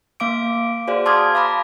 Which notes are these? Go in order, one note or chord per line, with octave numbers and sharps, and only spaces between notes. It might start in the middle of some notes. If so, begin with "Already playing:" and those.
A#3 F5 D6 D7
F#4 G#4 C5 D5 F5
A5 C6 D6 D#6 F6 G#6
F5 A#5 B5 D6